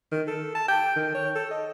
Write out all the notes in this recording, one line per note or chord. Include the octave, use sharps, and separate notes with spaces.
D#3
A4
A5
G5
D#3
C#5
A4
D#5